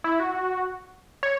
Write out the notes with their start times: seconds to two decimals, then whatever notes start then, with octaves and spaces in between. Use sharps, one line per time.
0.04 E4
0.20 F#4
1.23 C#5